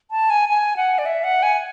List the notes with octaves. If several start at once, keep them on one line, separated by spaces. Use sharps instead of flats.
A5
G#5
G#5
F#5
D5
E5
F#5
G#5